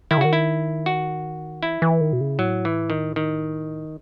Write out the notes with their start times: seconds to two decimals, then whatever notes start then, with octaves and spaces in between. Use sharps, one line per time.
0.11 D#3 E4
0.18 C#3
0.21 D#3 F#4
0.33 E4
0.86 F#4
1.63 E3 E4
1.82 E3
2.01 D#3
2.13 B2
2.21 C#3
2.39 A2 F#3
2.65 E3
2.90 D#3
3.16 D#3